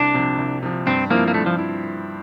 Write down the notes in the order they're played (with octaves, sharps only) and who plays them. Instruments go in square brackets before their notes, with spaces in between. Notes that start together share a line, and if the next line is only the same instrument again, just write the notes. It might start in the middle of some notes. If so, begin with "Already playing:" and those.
Already playing: [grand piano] C2 [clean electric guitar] D4
[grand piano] C3 F3
C2
C3 F3
[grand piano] G2 [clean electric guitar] C4
[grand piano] F3 C4 E4 [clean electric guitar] A#3
[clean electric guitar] A#3
[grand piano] G2 [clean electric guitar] A3
[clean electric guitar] F3
[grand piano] E4